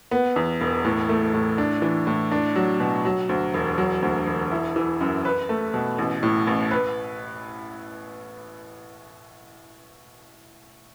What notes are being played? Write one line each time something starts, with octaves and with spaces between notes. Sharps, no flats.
B3
E2
E1
A2
A3
A2
D4
E3
A2
D4
F#3
B2
F#3
D2
E1
F#3
D2
E1
E4
E3
F#2
B4
A3
B2
A1
A2
A1
B4